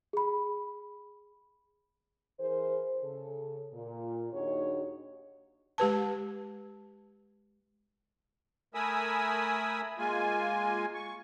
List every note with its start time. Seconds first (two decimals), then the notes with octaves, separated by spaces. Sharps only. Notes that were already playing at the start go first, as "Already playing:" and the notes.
0.13 G#4 B5
2.39 E3 G#4 A#4 C5
3.03 C#3 A4
3.73 A#2
4.33 D#2 D4 D#4 F#4 G#4 C#5
5.78 G#3 G4 B4 A5
8.74 A3 A#4 G#5 B5 D#6 E6
9.98 G#3 A#3 F4 G#5
10.94 C#6